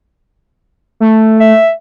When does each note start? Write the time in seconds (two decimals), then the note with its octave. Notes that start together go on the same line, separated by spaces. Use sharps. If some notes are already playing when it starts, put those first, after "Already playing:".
1.00 A3
1.40 E5